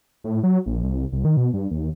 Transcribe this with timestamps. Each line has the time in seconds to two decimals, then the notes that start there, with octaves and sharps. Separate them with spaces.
0.24 A2
0.43 F#3
0.66 A#1
0.83 C2
1.12 C2
1.25 D#3
1.37 B2
1.54 G2
1.71 D#2